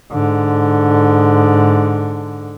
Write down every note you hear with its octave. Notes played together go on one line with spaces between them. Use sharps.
G#2 D3